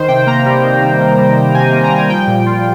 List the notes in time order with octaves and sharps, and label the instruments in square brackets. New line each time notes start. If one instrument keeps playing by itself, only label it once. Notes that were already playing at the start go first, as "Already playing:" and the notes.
Already playing: [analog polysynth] D#3 C5
C3 G5
A#3 A#5
G3
D#3
C3
A#3
G3
D#3
C3 G#5
A#3
A#5
G3 G#5
F3 G5
A#2
F4